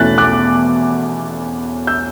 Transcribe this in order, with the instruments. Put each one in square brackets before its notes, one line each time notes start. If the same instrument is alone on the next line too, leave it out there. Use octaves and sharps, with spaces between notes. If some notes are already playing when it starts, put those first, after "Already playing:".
Already playing: [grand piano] E2 B2 A3 C#4 E4 F#6 A6 B6
D6 F#6
E6 G6